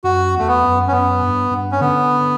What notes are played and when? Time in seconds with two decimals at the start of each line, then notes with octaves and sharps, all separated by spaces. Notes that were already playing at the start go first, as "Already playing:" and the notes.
0.04 F#2 F#4
0.34 E2 A3
0.48 B3
0.63 F#2
0.88 C#4
0.92 F#2 B3
1.22 G2
1.51 G2
1.72 C#4
1.81 D3 B3